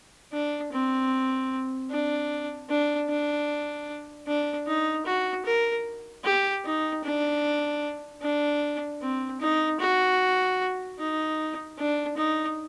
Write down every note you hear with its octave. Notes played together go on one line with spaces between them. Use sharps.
D4
C4
D4
D4
D4
D4
D#4
F#4
A#4
G4
D#4
D4
D4
C4
D#4
F#4
D#4
D4
D#4